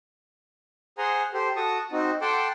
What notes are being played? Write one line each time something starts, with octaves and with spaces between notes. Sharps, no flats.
G#4 C5 F#5 G#5 A#5 C6
G4 A4 C5
F#4 A4 A5 C#6 D#6
C4 D#4 F#4
A4 F#5 G5 A5 C6 D6